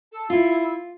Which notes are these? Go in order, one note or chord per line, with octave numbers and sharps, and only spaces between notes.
A4
E4 F4